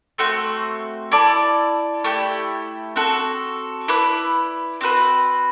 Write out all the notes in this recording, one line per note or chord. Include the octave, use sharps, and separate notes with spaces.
A3 C4 F#4 C5
E4 A4 D5 A5
A3 E4 G4
C4 F#4 A4
E4 B4 D5
C4 F#4 B4